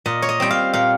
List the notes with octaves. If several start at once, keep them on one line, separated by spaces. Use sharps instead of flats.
A#2 D#5
C#5
D#5
G3 C4 G5
F5
A#2 F5